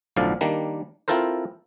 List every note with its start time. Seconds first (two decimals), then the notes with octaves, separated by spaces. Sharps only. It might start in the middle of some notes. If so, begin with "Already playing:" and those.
0.16 B1 A2 D3 F3 D5 F5
0.41 D#3 G3 A#3 D4
1.08 C4 E4 F4 A4 A#4 C5